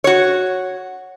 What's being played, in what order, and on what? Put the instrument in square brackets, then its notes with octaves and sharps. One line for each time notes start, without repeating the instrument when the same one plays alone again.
[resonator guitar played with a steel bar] F#4 C#5